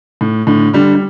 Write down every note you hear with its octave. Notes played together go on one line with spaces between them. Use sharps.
A2
A2 D3
D3 G3
G3